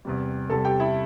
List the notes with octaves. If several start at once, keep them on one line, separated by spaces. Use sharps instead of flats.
E2 C3 G3
E2 C3 G3 A4 A5
G4 G5
E4 E5